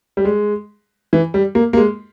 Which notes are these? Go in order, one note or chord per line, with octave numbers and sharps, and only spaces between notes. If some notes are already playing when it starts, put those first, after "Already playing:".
G3
G#3
E3
G3
A#3
A#3
G#3